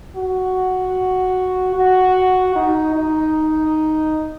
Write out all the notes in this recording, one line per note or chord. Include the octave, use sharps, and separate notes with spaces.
F#4
F#4
D#4
D#4